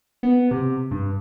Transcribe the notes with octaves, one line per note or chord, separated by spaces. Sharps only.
B3
C3
G2